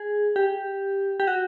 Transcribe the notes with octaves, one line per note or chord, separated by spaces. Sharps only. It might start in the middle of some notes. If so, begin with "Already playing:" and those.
Already playing: G#4
G4
G4
F#4